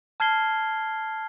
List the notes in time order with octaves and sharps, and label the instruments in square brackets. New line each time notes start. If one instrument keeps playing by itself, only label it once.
[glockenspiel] A5 F6 G#6 C7 G7